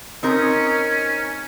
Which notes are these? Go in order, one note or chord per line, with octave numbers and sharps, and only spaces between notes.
C4 C#4 D#4 A#4